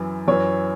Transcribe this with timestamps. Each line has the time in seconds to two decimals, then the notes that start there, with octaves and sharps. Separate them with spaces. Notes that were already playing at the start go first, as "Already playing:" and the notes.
Already playing: F#2 E3
0.28 F#2 E3 C#5